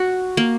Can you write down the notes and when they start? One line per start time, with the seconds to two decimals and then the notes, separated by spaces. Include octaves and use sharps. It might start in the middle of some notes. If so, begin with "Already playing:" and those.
Already playing: F#4
0.37 A#3